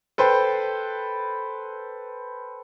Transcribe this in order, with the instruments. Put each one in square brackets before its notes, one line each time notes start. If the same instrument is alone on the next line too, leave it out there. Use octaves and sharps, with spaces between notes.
[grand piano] A4 B4 C5 G5